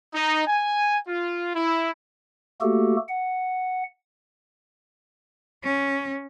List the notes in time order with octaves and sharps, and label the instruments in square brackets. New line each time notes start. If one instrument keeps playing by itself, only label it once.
[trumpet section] D#4
G#5
F4
E4
[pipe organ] A3 A#3 F#4 G4 A4
F#5
[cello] C#4